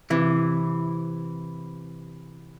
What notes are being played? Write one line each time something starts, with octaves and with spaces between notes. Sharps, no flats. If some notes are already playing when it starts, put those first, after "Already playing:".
C3 E3